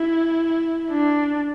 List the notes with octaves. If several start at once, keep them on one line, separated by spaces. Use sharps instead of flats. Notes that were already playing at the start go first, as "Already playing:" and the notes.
Already playing: E4
D4